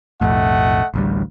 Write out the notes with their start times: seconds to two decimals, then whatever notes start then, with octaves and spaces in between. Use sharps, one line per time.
0.21 B1 F2 A2 A3 D#5 F#5
0.94 A1 D2 G3